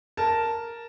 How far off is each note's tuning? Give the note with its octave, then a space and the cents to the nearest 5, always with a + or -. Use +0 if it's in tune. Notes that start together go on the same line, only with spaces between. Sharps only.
A#4 +0 A5 +0